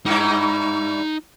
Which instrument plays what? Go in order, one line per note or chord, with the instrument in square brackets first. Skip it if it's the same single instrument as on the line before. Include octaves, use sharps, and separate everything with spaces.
[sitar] G2 E4 [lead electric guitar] D#4 A#5